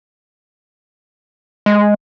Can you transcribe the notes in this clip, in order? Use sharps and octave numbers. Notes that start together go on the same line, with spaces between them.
G#3